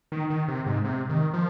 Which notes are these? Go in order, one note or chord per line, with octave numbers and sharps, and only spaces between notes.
D#3
D#3
C3
G#2
C3
D#3
F3